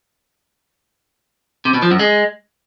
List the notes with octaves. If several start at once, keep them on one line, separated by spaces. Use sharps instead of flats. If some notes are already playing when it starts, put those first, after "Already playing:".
C3
B2
F3
F#2
G#3